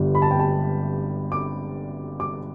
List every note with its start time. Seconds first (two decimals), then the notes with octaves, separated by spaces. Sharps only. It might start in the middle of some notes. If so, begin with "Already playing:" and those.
Already playing: G1 G2 G3
0.15 B5
0.22 A5
0.31 G5
0.39 A5
1.32 D6
2.20 D6